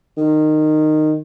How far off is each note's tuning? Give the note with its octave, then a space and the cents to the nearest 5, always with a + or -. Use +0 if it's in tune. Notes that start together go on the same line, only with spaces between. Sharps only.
D#3 -15